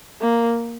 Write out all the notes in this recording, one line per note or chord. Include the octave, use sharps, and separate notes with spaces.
A#3